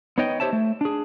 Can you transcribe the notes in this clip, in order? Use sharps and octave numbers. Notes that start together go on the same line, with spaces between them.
B3 D#4 C#5 D#5 G5
G4 C5 C#5 E5 A5
A3
D4 G#4